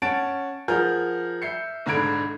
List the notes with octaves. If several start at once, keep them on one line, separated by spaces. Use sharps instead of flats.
C#4 F#5 A5 A6 D7
F3 G#4 A#4 F#5 F6 G6
E5 G6 C7 C#7
B1 G#2 D3 B5 G#6 D7